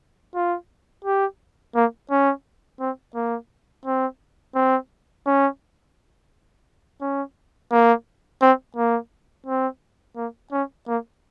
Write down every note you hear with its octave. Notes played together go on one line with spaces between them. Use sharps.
F4
G4
A#3
C#4
C4
A#3
C4
C4
C#4
C#4
A#3
C4
A#3
C4
A#3
C#4
A#3